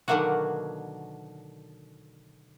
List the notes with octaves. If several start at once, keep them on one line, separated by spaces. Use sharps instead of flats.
B2 D3 D#3 F#3 A#3 F#4